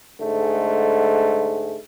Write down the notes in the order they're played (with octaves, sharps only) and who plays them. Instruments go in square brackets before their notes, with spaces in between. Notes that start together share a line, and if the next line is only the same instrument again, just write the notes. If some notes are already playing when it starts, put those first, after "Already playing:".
[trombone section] G#2 D3 G#3 A3